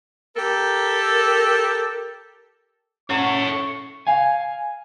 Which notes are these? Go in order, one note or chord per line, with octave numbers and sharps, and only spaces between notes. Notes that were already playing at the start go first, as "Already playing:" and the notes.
G4 A4 A#4
C#4 A4 C#5 F#5 C#6
F5 G#5